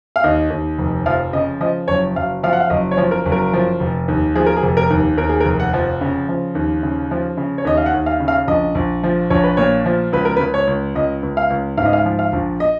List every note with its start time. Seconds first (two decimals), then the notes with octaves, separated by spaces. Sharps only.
0.16 F5
0.24 D#2 D#5
0.50 D#2
0.78 F1
1.06 F3 F5
1.33 C#3 D#5
1.61 F3 D#5
1.88 F#1 C#5
2.16 F#1 F5
2.43 F3 F5
2.53 F#5
2.60 F5
2.70 F#1 D#5
2.91 C#5
2.98 F3
3.11 A#4
3.25 F#1
3.32 A#4
3.53 F3
3.80 F1
4.08 D#2
4.35 F3 G#4
4.46 A#4
4.57 G#4
4.63 F1
4.77 A#4
4.90 D#2
5.17 D#2 A#4
5.29 G#4
5.40 A#4
5.45 F1
5.60 F#5
5.73 F3
6.01 C#3
6.29 F3
6.55 D#2
6.83 C#3
7.11 F3
7.37 C#3
7.58 C#5
7.65 D#2 D#5
7.77 F5
7.86 F#5
7.94 D#2
8.06 F5
8.20 C#3
8.28 F5
8.48 A#1 D#5
8.75 A#1
9.03 F3
9.30 A#1 C#5
9.44 B4
9.57 A#2 C#5
9.86 F3
10.12 C#2 B4
10.25 A#4
10.37 B4
10.40 C#2
10.54 C#5
10.67 C#2
10.95 C#2 D#5
11.23 C#2
11.37 F5
11.50 C#2
11.78 G#2 F5
11.86 D#5
11.93 F5
12.05 F3
12.19 F5
12.33 A#1
12.60 D#5